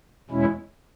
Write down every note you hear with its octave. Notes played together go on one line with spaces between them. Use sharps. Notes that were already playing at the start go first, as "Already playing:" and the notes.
E2 B2 G#3 C#4 E4